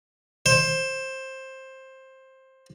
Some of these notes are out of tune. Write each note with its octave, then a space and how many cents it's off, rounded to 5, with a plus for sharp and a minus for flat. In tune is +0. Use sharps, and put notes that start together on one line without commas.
C5 +15